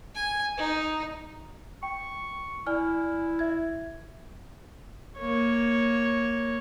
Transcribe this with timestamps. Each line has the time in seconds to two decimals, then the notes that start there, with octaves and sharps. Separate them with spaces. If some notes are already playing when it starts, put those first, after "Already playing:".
0.15 G#5
0.58 D#4
1.83 G5 C#6
2.67 E4 D5 G#5 F6
3.39 E5 G#6
5.18 A#3 C#5